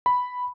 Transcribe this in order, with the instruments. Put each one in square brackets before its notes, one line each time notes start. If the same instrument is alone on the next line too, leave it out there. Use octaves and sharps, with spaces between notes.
[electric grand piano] B5